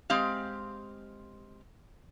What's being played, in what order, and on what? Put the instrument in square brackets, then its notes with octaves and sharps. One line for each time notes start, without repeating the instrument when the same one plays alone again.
[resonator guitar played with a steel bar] G#3 C4 G4 F5